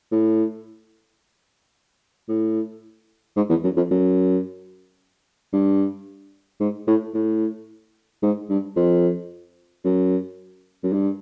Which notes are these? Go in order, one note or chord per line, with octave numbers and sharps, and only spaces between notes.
A2
A2
G#2
E2
F#2
F2
F#2
G2
G#2
A2
A2
G#2
G2
F2
F#2
F#2
G2